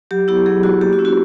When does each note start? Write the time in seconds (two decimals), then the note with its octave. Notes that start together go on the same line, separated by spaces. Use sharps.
0.11 F#3 G4
0.28 B3 E4 G4
0.46 F#3 G#4
0.63 B3 E4 F#4
0.81 A#3 G4
0.93 F#4
0.99 C#4 E4
1.05 F#4